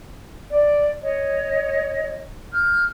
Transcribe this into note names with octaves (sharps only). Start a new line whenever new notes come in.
D5
C#5 D#5
F6 G6